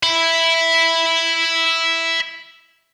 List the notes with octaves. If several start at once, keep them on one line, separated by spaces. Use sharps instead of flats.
E5 B5